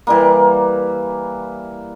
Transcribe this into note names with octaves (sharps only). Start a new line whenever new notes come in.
E3 G3 A#3